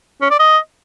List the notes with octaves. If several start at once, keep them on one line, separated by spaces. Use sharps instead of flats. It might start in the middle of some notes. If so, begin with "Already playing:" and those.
C#4
D5
D#5